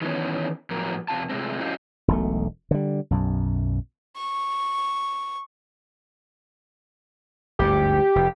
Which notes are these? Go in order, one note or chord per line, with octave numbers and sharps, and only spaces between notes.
D#3 E3 F#3 B3 C#4
A2 F3 F#3 B3 A#4
F2 C3 D#4 F5 A5
C3 G#3 A3 C4
C#4 E4 F#4 C5 D#5 F5
E1 B1 A3
D3 G3
B1 F#2
C#6
G1 D2 G#2 G4
F1